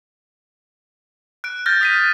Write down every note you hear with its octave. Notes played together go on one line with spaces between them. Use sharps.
F#6 D7
F6 G6 A6 A#6
D#6 B6 D#7